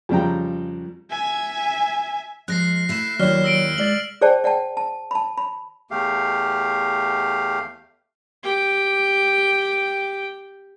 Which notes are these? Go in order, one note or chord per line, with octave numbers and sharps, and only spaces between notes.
F2 C#3 G3 G5 A#5
E5 G#5
F3 G#3 F#6 A#6 C7
A3 E4 B6 E7
D#2 F#3 E4 C#5 D5 F6
E6 A#6 D7
G#3 D5 A6 F#7
G#4 C5 D5 G5 A5
D5 F#5 G5 A5
A5
A5 B5
B5
E2 A3 G4 F5
G4 G5